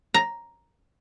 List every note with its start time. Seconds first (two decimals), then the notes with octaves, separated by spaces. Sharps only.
0.14 A#5